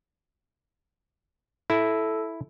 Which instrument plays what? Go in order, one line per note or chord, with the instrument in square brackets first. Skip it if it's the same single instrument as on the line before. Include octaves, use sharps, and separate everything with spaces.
[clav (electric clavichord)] E4 [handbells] A4